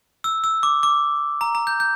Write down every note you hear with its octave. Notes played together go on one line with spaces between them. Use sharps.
E6
E6
D6
D6
A#5
A#5
G6
G6